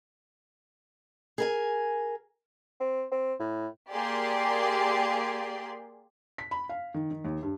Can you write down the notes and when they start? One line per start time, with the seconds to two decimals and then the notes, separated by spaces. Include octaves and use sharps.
1.38 G#4 A#4 G#5
2.80 C4
3.12 C4
3.40 A2
3.90 A#3 G4 G#4 D5 C6
6.38 B6
6.51 B5
6.69 F5
6.94 D#3
7.11 D#3
7.25 D#2
7.43 G2